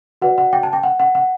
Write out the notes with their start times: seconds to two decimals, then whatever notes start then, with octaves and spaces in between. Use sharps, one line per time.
0.22 F#4 B4 D5 F#5
0.38 F#5
0.53 G5
0.63 A5
0.73 G5
0.83 F#5
1.00 F#5
1.15 F#5